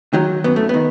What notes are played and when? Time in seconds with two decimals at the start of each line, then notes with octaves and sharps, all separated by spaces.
0.13 D#3 F#3
0.44 F#2 B3
0.56 A3
0.69 D#3 B3